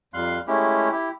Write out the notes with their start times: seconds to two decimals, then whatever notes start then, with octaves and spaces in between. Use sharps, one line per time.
0.14 F2 G3 F5 C6 F#6
0.47 G#3 A3 C#4 E4 G4
0.92 E4 G4